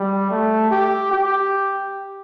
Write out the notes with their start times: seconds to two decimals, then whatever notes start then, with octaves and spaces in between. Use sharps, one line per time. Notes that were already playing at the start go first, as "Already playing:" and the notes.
Already playing: G3
0.30 A3
0.71 G4
1.11 G4